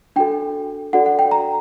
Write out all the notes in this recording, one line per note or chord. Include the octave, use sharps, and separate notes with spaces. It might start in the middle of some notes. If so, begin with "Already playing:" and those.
D4 F#4 A4 G5
D4 F#4 A4 D5 F#5
F#5
G5
A#5